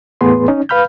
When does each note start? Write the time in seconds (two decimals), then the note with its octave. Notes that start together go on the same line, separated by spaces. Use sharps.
0.21 E2 A2 B3 G#4 B4 C6
0.48 C#4 D#4
0.69 B4 F5 B5 F6 G6